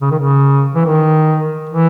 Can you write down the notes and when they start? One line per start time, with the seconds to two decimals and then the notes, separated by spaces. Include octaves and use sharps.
0.02 C#3
0.11 D#3
0.19 C#3
0.75 E3
0.86 D#3
1.69 E3